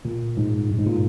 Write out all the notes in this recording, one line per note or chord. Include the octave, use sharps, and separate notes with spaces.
A#2
G#2
G2
G#2
A#2